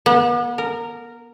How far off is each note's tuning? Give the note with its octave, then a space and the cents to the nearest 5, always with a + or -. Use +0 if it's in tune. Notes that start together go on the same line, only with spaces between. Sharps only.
B3 -40
A#4 -10